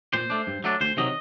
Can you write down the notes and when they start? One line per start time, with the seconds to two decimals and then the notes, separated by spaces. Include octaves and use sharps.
0.13 A#2 C5
0.30 A3 D4
0.47 G2
0.64 F#3 A3 D4
0.81 D2 C5
0.97 C3 D#3 F#3 D#5